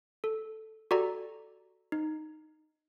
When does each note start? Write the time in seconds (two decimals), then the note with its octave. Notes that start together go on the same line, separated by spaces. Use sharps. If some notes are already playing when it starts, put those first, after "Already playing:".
0.24 A4
0.91 F#4 G4 A4 D5 A#5
1.92 D#4